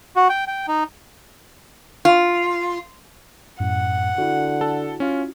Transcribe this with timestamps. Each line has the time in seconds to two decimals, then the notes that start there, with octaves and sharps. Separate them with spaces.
0.16 F#4
0.29 G5
0.47 G5
0.68 D#4
2.05 F4
3.60 F#2 A2 F#5
4.18 D3 E4 F#4
4.61 A4
5.00 C#4 F4